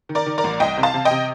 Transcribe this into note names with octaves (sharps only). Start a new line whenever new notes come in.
D#3
A#4 D5
D#3
A#4 D5
A1
C2 D#5 G5
C3
F5 A5
C3
D#5 G5
C3